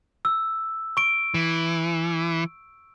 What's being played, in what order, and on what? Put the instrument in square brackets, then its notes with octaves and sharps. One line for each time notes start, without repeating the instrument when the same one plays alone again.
[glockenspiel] E6
C#6 D7
[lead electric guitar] E3